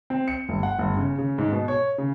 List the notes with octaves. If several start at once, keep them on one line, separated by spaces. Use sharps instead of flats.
C4
C#7
G1
F#5
G1
C#3
C#3
G#2
B2
C#5
C#3